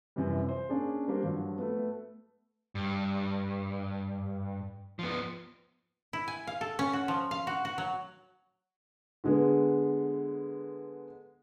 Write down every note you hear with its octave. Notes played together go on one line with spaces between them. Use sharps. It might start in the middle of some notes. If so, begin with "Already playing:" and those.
F#2 C3 E3 F3 G3
C5
A#3 C#4 D4 G#4
G3 A#3 D4 G4 A#4 C5
G2 F3 F#3
A3 B3
G2
F3 B3
E4
G#5
F5
A4
C#4
F#4
F3
F5
F#4
F#4
F#3
D3 G#3 B3